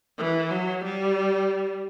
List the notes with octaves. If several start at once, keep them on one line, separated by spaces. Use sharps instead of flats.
E3
F#3
G3